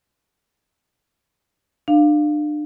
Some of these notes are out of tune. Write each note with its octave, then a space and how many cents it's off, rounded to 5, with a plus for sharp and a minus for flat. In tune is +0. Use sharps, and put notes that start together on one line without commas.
D4 +30 F5 +0